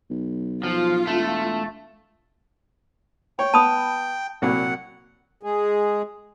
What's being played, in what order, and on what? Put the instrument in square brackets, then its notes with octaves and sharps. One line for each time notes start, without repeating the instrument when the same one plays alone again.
[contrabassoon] B1
[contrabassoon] B1 [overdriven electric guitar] F3 [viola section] F4
[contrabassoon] E1 [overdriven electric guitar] A3
[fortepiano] C#5 [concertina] G5
[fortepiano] B3 [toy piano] A5 B5 D#6
[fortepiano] C2 A#2 F#3 [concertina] F#5
[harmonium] G#3 G#4